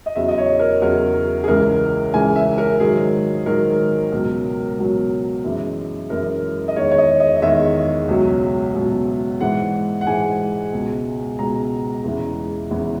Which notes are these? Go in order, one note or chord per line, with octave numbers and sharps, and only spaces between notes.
D#5
E2 C#3 F#3 E5
D#5
C#5
A#4
E2 C#3 F#3 A#4
G#4
C#2 C#3 E3 G#3 A#4
C#2 C#3 E3 G#3 G#5
E5
A#4
G#2 D#3 F#3 G#4
G#2 D#3 F#3 A#4
C#2 B2 F#3
C#2 B2 F#3
F#2 E3 G#3
F#2 E3 G#3 A#4
D#5
E2 D#3 G#3 C#5
C#5
D#5
D#5
D#5
E2 D#3 G#3 E5
C#2 B2 F#3
C#2 B2 F#3
G#2 E3 G#3 F#5
F#5
G#2 E3 G#3 G#5
C#2 B2 G#3
C#2 B2 G#3 A#5
E2 C#3 E3 G#3
E2 C#3 E3 G#3